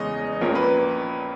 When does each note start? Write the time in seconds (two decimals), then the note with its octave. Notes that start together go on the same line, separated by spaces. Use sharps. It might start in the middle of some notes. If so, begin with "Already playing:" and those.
Already playing: E2 C#3 G#3 C#4 D#5
0.41 A#1 A#2 A#3 C#4
0.55 B4